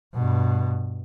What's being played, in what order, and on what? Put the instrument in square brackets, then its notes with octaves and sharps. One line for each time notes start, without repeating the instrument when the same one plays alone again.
[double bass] G2 B2